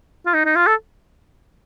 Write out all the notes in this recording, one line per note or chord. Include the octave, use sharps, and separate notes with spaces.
F4
D#4
D#4
F4
A4